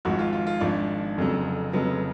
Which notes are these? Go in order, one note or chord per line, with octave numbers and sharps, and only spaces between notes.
G#1 G#2 F3 F#4
F4
F4
F4
G#1 G#2 F3 D4
F1 F2 C#3 F#3
F1 F2 C#3 F#3 B3